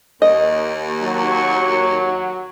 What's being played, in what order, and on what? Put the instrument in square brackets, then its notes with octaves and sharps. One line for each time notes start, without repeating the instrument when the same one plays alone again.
[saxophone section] D#2 [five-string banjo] D#5
[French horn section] F#3 [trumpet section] C#6